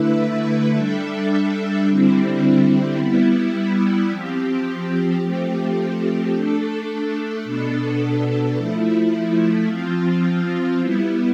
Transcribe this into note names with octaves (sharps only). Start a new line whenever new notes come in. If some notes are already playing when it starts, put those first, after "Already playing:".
Already playing: D3 A3 E4 B4 E5
G3 D4 A4 E5
D3 G3 C4 E4
G3 B3 E4
F3 C4 G4
F3 A3 C4 G4
A3 D4 A4
B2 B3 D4 A4
F3 A3 E4
F3 C4 F4
G3 B3 E4